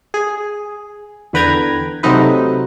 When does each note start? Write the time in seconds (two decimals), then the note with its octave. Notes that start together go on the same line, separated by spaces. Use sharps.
0.14 G#4
1.33 E2 D3 B4 G5 A#5 G#6
2.03 C3 F#3 A3 C4 D#4 B4